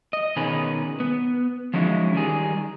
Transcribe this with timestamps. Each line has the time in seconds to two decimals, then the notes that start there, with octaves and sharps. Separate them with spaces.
0.13 D#5
0.36 B2 D#3 C#4 G#4 B4
1.00 B3
1.74 F3 F#3 G#3 C#4 D#4 E4
2.14 D#3 G3 G#4